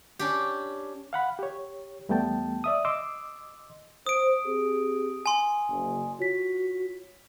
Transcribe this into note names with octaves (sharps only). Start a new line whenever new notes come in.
C#4 D4 G4
F5 F#5 B5
G4 C#5
E2 G3 A3 B3 G5 A5
D5 E5 D#6
D#5 C6 D6 E6
C5 D#6 D7
C4 G4 G#4
G#5 C6
F#1
F4 F#4 C#5 B6